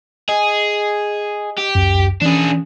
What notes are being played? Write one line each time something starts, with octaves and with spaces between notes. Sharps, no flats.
G#4 D#5
G4
G#1 C#2 F#2
E3 C#4 D4 G#4